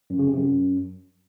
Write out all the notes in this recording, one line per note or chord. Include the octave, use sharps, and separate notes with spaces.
F#2
C#3
C3
F#2